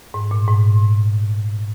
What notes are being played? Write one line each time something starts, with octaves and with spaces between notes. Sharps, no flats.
G#2
A#2
G#2